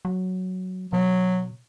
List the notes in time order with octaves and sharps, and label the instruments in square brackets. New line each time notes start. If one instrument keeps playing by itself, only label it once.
[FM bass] F#3
[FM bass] B2 [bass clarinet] F#3